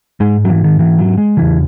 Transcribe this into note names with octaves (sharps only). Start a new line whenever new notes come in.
G#2 G#3
F#3
E3
D#3
E3
F#3
G#3
E2 C#3 E3